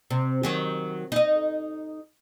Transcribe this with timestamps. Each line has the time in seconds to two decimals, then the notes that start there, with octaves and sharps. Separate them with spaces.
0.11 C3
0.43 D#3 F#3 G4
1.12 D#4 D#5